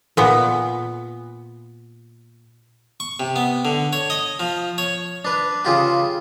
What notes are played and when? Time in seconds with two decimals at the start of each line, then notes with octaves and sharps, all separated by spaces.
0.17 A#2 B3
3.00 C#6
3.20 C3
3.36 B3
3.65 D3
3.93 C#5
4.10 D#5
4.40 F3
4.78 C#5
5.25 D4 B4
5.65 C#3 F4 G4